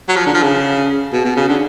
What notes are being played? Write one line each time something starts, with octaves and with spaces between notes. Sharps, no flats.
F#3
F3
D3
F3
C#3
B2
B2
C#3
D3